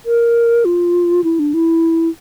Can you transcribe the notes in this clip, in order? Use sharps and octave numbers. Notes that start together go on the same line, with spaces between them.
A#4
F4
E4
D4
E4